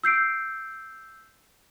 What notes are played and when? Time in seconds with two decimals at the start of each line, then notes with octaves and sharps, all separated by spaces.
0.04 E6 G6 C7 D7